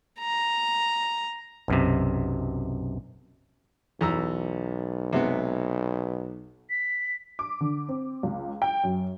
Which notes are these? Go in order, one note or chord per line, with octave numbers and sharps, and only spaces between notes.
A#5
B1 F#2 C3
B1 E2 A#5 E6
C3 G#3 B3
B6
D6
D3
C4
C#2
G5
F#2